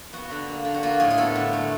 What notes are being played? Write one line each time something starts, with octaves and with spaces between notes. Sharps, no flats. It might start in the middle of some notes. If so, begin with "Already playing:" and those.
B3 F#4
D3
A#3
D3
F#4
A#3 F4
A2 G#4
G#4
B3 A4
D3
A3